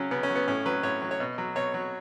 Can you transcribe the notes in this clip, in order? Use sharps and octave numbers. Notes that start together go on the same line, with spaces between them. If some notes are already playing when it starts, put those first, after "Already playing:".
Already playing: C#3 F#3 C#4
C#3 B3
C#4
F#3
B3
A2 C#4
F#3 B4
A2 C#5
F#3
C#5
B2
F#3
B2 C#5
F#3